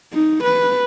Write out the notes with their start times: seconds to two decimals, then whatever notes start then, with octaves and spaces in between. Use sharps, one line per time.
0.13 D#4
0.44 B4